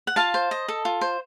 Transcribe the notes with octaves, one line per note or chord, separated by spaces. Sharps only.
F#5
F4 F5 A5
C5
D#5
A4
F4
C5